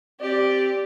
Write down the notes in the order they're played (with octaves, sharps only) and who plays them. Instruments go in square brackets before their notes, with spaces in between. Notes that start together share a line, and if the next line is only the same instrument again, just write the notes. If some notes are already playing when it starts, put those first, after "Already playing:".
[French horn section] C4 D5 [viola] G4